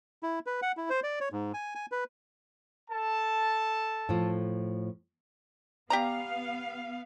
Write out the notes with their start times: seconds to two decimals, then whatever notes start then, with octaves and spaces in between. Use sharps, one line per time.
0.23 E4
0.46 B4
0.62 F#5
0.77 E4
0.90 C5
1.03 D5
1.20 C#5
1.32 G#2
1.54 G#5
1.75 G#5
1.92 B4
2.91 A4 A5
4.09 A2 F3
5.90 B3 G4 D5 F5 A#5